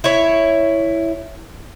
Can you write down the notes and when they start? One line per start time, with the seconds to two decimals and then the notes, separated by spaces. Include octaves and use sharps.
0.04 E4 C#5